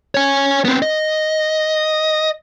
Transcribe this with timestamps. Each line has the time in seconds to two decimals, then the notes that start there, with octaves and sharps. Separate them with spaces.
0.15 C#5 G#5
0.65 B3 C4
0.82 D#5